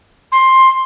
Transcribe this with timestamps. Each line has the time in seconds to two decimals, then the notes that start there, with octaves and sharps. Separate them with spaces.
0.32 C6